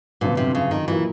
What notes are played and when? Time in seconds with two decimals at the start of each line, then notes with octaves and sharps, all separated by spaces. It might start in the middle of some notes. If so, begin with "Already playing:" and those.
0.21 G1 F2 A#2 D3 F#3 B3
0.37 C3
0.55 C#3
0.71 D#3
0.88 A#2 E3 F#3 A#3